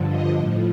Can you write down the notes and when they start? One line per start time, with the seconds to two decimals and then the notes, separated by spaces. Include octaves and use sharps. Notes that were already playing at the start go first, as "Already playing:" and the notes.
Already playing: G2 D3 F3
0.09 D#5
0.38 A2 F3